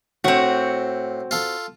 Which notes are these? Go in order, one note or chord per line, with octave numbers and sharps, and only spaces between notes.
A2 C4 F#4
F4 A4